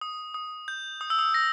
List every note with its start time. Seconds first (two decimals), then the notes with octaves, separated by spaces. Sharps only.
0.01 D#6
0.34 D#6
0.68 G6
1.01 D#6
1.10 E6
1.19 D#6
1.34 A#6